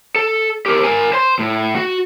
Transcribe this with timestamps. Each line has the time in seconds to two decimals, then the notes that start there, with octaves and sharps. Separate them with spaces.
0.16 A4
0.66 G4 A#4
0.84 A#4 G#5
1.13 C5 C6
1.39 A2
1.76 F#4